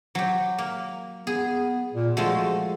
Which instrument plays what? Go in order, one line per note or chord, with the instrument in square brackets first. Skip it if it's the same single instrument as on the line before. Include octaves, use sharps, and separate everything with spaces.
[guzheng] F#3 G4
A#3
[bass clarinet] B3 [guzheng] G#4
[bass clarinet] A#2
[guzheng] F3 G#3 A3 [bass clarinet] F#4